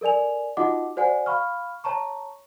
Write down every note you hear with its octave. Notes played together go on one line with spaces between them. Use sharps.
A4 A#4 D5 G#5 F7
D#4 F4 F#4 D#5 F#5 D6
F#4 C5 D5 F#5 G#5
F5 B5 C#6 F6
C#5 A5 A#5 C#6